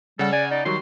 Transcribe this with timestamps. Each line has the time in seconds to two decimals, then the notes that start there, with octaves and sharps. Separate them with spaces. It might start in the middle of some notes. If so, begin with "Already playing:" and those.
0.19 C#3 G3 A4 F#5
0.33 D5 G#5
0.51 D#4 D5
0.66 D#3 F#3 G3 F#4 C6